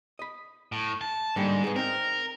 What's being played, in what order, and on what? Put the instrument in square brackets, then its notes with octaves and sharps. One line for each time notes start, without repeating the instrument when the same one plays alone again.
[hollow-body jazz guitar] D#5 B5
[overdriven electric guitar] A2
A5
[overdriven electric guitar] G#2 [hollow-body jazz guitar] D3 G3 A#3
[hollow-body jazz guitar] B3 G#4
[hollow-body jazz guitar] C4 D#4 [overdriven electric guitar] A#4